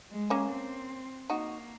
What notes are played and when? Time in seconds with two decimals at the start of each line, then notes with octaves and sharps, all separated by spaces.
0.11 G#3
0.30 A#3 C#4
0.50 C4
1.30 A#3 D#4 F#4